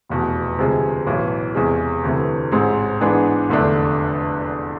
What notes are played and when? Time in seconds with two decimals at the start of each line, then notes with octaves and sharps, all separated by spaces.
0.09 F1 E2 B2
0.58 D2 C3 F3 G#3
1.07 B1 A2 E3
1.55 E2 C3 G#3
2.04 D2 C3 E3 A3
2.52 A1 G#2 G#3 C4
3.01 G#2 E3 B3 D4 G#4
3.49 F1 E2 D3 A3 D4